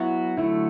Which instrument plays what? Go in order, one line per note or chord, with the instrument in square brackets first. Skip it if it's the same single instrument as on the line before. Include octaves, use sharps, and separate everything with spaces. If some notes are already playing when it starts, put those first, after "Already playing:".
Already playing: [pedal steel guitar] F#3 B3 F#4 [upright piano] E4
[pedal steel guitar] D3 F#3 A3 [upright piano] E4